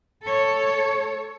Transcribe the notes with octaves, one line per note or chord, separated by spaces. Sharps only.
A4 C#5